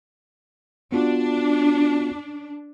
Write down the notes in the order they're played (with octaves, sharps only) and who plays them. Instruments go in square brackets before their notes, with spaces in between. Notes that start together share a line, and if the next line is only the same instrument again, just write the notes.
[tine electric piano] B3 F4 F#4 [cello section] D4